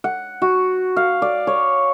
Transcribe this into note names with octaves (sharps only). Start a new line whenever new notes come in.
F#5
F#4
F5
D5
C#5